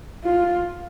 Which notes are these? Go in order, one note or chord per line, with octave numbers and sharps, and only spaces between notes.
F4